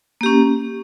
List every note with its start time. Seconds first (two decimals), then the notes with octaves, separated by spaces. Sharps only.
0.21 A#3
0.23 G4
0.26 C#4